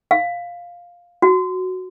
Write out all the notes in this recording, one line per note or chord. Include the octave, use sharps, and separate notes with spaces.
F5
F#4